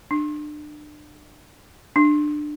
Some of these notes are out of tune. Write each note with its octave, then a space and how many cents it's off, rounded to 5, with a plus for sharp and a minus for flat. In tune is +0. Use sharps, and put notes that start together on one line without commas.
D4 +35
D4 +25